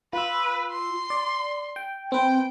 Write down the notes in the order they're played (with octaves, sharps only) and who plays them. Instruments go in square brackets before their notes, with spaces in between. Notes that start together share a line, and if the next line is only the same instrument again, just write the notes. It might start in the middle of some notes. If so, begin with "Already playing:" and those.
[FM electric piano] F4 E6 [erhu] B4
[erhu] C6
[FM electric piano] D5
G5
[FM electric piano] C4 B4 [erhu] G5